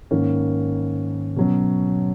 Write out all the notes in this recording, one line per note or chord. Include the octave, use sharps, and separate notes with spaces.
G#2 D#3 A#3 C#4
B2 F#3 C#4